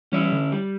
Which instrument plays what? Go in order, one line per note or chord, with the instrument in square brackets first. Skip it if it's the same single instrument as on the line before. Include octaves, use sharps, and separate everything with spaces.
[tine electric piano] E3 G3 [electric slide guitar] C#4 E4
[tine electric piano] D3
[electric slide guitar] G3